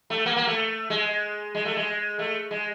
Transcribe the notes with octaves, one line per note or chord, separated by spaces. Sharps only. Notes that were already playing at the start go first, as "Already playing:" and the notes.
A3
A#3
A#3
A3
G#3
G#3
A3
G#3
A3
G#3